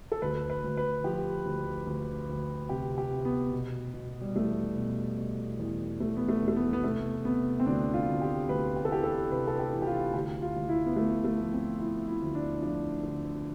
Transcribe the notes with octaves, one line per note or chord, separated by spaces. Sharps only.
A4
D2 B4
B4
D2
B4
F3 G4
D2
D2
D2
C3 G4
G4
C3
B3
B2
B2
G3
E2 A3
B2
B2
E2
E2 A3
B3
A3
E2
A3
B3
B3
C3 A3
C3 B3
C4
D2 D4
F4
D2
G4
D2 B4
G4
A4
E3 G4
A4
C3 B4
A4
G4
E3
G4
F4
D2 G4
F4
D2
E4
B3
D2 A3
A3
F3
C4
F3 E4
E4
D2
D4
F3 D4
D3